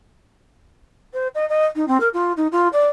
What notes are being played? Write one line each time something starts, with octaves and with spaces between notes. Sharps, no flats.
C5
D#5
D#5
D#4
C4
A#4
F4
D#4
F4
D5